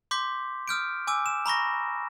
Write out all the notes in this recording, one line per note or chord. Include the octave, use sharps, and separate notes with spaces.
C6 D6 G6 B6
D#6 F6 G6 D7
G#5 D6 E6
E7
A#5 B5 C#6 A#6